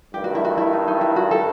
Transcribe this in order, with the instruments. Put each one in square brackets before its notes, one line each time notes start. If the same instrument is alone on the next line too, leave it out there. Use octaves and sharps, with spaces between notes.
[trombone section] G2 D#3 A3 [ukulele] G4
[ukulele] F#4
E4
F#4
E4
D#4
D#4
E4
F#4
A4